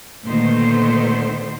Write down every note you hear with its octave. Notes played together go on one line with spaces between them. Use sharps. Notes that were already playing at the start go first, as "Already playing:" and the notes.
D2 A#2 D#3 A3 B3 C5